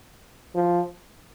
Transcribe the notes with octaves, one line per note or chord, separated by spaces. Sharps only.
F3